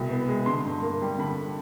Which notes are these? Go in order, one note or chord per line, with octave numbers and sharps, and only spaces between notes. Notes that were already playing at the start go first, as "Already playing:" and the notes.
Already playing: C2 B2 G#3
B3
G#3
D3 C6
G2
A#3
G3
D3 B5